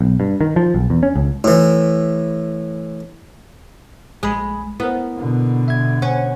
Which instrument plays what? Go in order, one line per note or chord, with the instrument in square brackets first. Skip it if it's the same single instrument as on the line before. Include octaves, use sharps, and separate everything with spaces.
[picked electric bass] B1
G2
D#3
F3
B1
E2
C#4
C#2
[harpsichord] A2 E3
[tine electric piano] A#1 B5 [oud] G#3
[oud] B3 [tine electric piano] E4 A#4
[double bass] B2 D3
[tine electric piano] E5 G#6
[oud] C#4 [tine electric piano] F#5 G#5